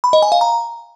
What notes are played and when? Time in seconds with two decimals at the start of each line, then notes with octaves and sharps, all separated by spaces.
0.04 B5
0.13 D#5
0.22 G#5
0.32 F5
0.41 A#5